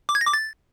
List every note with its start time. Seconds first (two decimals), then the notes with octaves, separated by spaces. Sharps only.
0.09 D6
0.15 G#6
0.21 A#6
0.27 D6
0.33 A6